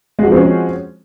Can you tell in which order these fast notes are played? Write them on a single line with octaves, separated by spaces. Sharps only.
G#3 F#4 F3 C4 C#4